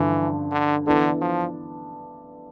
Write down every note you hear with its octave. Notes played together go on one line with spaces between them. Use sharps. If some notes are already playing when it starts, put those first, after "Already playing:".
Already playing: G2 D3 E3 F3
D3
D3 E3 B3 D4 A4
F3